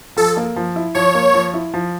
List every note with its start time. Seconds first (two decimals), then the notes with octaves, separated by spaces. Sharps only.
0.17 F3 A4
0.37 A#3
0.56 F3
0.76 E4
0.95 F3 C#5
1.15 A#3
1.34 F3
1.54 E4
1.74 F3